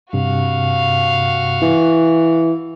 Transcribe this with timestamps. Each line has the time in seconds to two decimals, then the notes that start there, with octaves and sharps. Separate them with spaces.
0.13 G2 C3 F#4 F5
1.62 E3